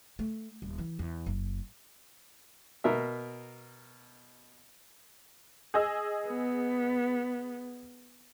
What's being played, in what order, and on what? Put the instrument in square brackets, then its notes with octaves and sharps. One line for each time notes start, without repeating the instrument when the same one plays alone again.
[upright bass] A3
D#1
E3
E2
F#1
[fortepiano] B2 A#4 E5
[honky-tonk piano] G#4 D#5 E6
[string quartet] B3